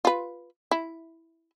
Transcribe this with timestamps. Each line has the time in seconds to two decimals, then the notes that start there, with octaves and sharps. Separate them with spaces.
0.05 F4 B4
0.71 E4